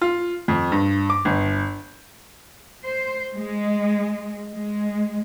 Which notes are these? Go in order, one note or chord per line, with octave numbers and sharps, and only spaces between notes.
F4
F2
G2
D6
G1
C5
G#3
G#3